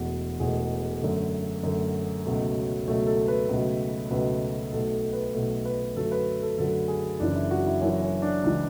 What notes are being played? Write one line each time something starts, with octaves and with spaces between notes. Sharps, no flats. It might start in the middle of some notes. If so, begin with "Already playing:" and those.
Already playing: E1 E2 B2 A3 F#4
E1 E2 B2 A3 G#4
F#2 D3 A3
F#2 D3 A3
C#2 B2 F#3 A3
C#2 B2 F#3 A3
A4
B4
C#2 B2 F#3 A3
C#2 B2 F#3 A3 B4
B1 B2 A3 A4
A4
B4
B1 B2 A3 A4
B4
F#2 D3 F#3 A3 A4
B4
A4
F#2 D3 F#3 A3 A4
G#4
F#1 F#2 E3 D4
E4
F#4
E4
F#1 F#2 E3 C#4
C#4
D4
C#2 C#3 E3 G#3